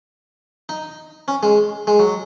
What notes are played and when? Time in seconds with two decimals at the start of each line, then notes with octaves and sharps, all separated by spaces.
0.69 D#4
1.28 C#4
1.43 G#3
1.87 G#3
1.99 F#3